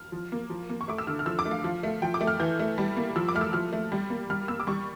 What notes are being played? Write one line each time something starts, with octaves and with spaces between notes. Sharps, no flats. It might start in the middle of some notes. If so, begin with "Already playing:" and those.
Already playing: F6
F3
A#3
F3
A#3
C#6
A3 D6
E6
D3 F6
F6
F3 E6
D6
A3
F5
F3
A3
F3 G5
D6
A3
F6
E3 G6
A3
G3
A#3
F3 E6
D6
A3 F6
E6
F3 F6
A3
G3
A#3
G3 F6
A#3 E6
D6
G3 C#6